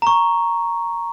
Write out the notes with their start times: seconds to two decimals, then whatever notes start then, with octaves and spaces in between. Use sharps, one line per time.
0.02 A#5 C#6